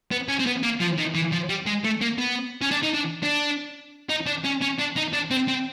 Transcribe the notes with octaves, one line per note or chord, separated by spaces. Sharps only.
B3
C#4
C4
B3
A#3
F3
D#3
E3
F3
G3
G#3
A3
A#3
B3
C#4
D4
D#4
D4
D4
D#4
D4
C#4
C#4
D4
D#4
D4
C4
C4